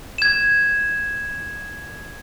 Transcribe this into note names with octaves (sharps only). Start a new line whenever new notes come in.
G#6 E7